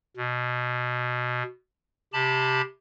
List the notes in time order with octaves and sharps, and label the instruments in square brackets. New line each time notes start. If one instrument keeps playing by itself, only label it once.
[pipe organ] B2
C3 G4 A5 B5